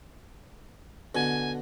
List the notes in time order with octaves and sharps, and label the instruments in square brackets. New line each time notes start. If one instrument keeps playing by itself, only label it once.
[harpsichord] B2 D3 [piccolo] G#5